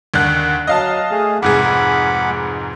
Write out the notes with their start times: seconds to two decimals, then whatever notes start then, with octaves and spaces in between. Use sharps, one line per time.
0.14 D#2 D3 F#6
0.67 F#3 D#5 F5 A5
1.11 A3 G#4
1.42 F1 G#2 G#4 F#5 B5 D6